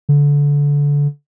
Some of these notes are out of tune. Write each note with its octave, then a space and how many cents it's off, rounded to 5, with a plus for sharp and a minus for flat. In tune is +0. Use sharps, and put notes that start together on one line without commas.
D3 -25